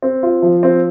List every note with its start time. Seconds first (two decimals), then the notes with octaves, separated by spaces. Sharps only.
0.02 C4
0.23 F4
0.42 F3
0.63 C4